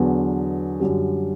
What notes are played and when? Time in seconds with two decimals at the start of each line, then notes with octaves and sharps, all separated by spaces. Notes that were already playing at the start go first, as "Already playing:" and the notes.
Already playing: E2 D3 F#3 B3
0.80 F#2 D3 G3